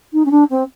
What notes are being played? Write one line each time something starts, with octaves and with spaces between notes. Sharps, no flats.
D#4
C#4
D4
C4